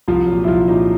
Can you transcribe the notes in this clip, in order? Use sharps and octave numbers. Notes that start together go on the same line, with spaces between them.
C2 F3 F4
A#2 F#3
E4
C2 F3 F4
A#2 F#3 D#4